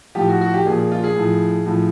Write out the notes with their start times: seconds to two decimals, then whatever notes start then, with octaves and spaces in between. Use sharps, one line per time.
0.15 A2 F3 G4
0.29 F#4
0.41 F#4
0.54 G4
0.65 A#2 F3 G#4
0.79 G#4
0.92 F4
1.04 G#4
1.16 A2 F3
1.66 A2 F3